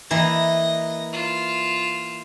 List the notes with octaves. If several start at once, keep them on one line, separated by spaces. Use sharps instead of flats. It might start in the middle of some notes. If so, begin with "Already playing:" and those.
E3 A#3 D#5 A#6
F4 E7